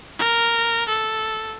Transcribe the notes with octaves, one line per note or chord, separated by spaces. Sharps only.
A#4
A4